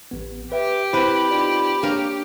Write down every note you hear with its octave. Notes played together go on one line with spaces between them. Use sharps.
A1 B3
G4 B4 E5 G5
C4 E4 B4 B5
D#4 F4 D5
A#3 D4 A#4 C#5